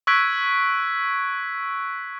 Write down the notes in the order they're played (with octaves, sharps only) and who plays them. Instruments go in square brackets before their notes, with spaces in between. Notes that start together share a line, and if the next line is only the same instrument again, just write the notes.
[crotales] C#6 E6 F#6 G#6 B6 D7